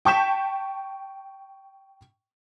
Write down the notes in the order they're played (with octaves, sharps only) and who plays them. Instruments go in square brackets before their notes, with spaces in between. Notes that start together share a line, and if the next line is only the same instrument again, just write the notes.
[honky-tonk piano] G5 A5 C#6 G6 B6 E7